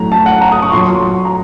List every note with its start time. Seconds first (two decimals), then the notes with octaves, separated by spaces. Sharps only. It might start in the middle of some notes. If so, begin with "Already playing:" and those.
Already playing: A2 F#3 A#5
0.12 A5
0.26 F#5
0.41 A#5
0.52 D#6
0.62 C#6
0.71 A#2 F#3 C6
0.80 C#6
0.88 C6
1.25 A#5